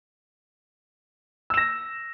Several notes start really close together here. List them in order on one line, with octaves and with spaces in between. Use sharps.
E6 E7 A#6